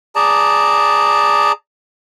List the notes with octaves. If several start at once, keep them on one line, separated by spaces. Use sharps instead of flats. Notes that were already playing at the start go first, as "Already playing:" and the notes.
G#4 D5 A5 A#5